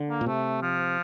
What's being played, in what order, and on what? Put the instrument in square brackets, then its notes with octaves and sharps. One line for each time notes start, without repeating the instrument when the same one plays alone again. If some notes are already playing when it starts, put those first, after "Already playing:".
Already playing: [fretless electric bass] D3
[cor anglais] A#3
[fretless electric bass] A#2
[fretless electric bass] C3 [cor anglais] A3
[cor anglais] F3